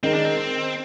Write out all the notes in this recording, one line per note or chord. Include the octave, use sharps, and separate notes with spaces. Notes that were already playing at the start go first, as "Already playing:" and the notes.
D#3 G#3 C4 D#4 A#4
D4
C4